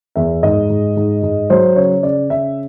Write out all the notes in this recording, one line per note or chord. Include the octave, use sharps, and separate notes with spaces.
E2 E5
G#2 D#5
G#2
G#2
G#2
F#3 C5
C#3 C#5
C#3 D5
C#3 E5